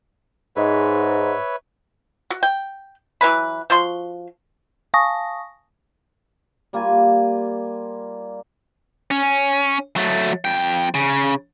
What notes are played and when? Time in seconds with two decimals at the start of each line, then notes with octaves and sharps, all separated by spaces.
0.56 G#2 B4 C#5 E5
2.30 F#4
2.43 G5
3.21 E3 F#3 B4 B5
3.70 F3 F#4 C6
4.94 F5 G#5 A5 C#6 D#6 A#6
6.73 G3 A#3 F4 G#5
9.11 C#4
9.96 F#3 A3
10.45 F2 G5
10.95 C#3